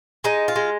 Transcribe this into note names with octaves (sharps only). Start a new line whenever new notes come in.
G#3 D#4
F4
G#3